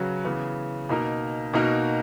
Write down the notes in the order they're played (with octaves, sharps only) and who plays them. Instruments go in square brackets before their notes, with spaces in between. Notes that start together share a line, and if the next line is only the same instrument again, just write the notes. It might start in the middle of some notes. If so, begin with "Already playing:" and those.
Already playing: [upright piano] C#3 F#3 C#4 F#4 B4
C#3 E3 B3
B2 A#3 D#4 A#4
B2 A#3 D#4 F#4 A#4